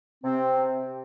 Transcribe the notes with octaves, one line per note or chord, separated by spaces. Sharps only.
C3 C4